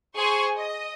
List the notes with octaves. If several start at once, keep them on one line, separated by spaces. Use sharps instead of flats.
G#4 C5 G#5 C#6
D#5